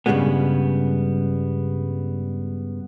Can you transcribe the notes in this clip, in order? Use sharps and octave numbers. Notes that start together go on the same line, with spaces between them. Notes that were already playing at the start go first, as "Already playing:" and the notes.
G2 C#3 E3 G3 G#3 B3